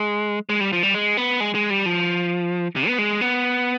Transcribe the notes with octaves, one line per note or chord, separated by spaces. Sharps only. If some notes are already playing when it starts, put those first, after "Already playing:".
Already playing: G#3
G#3
G3
F3
G3
G#3
B3
G#3
G#3
G3
F3
C3
B3
G#3
B3